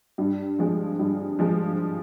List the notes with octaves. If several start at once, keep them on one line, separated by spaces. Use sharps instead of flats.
G2
F3 G#3
G2
F3 G#3